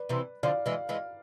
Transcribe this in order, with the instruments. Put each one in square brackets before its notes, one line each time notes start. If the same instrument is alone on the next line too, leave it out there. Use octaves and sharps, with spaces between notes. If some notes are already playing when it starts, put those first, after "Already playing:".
Already playing: [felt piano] B4 D5
[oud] C3 E3
[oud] D3 F3 [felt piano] D5 F5
[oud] E3 G#3
E3 G#3